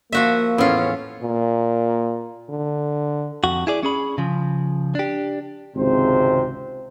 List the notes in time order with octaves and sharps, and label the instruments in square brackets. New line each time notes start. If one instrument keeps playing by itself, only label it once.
[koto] F3 F#4 E5 [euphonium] A#3
[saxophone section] E2 B3 C#4 [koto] A2 F4
[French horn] A#2
D3
[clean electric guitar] F2 F#4
E4 G#4 D5
C#4 G#4 B5
C#3 F3
D4 G4
[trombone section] G#1 C#2 C3 C5